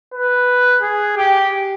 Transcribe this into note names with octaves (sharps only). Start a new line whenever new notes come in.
B4
G#4
G4